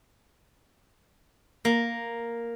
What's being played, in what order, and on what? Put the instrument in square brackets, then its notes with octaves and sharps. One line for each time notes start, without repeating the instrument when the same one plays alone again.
[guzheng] A#3